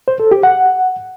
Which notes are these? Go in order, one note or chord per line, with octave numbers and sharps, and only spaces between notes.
C5
A4
G4
F#5